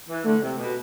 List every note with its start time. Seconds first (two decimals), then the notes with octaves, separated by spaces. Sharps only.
0.09 E3
0.25 D3 A3
0.41 C3
0.57 B2